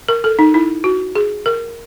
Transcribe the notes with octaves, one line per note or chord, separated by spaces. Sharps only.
A#4
A4
D#4
E4
F#4
G#4
A#4